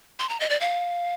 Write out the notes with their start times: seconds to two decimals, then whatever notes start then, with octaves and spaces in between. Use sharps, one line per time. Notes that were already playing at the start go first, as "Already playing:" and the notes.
0.19 C6
0.29 A#5
0.40 D#5
0.50 D5
0.61 F5